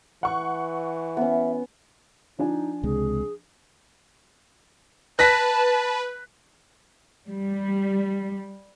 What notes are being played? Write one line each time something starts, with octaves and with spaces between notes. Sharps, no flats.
E3 F#5 C#6
B3 C#4 E5
F3 D4 D#4 G#5
C#2 C3 G#3 G#4
B4 A5 F#6 A#6 B6
G3